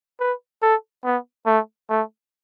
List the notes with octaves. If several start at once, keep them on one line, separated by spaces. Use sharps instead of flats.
B4
A4
B3
A3
A3